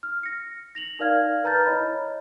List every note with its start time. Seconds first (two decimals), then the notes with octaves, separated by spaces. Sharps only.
0.03 F6
0.23 A#6 C#7
0.75 A#6 F7 F#7
0.99 D#4 A#4 D5 F5 F6 G#6
1.44 B4 A5 A#5 F6 G6 A6
1.66 E4 C#5 D#5 B5